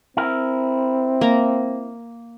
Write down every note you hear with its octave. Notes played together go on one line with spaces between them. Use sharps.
C4 E4 A#4
A#3 A#5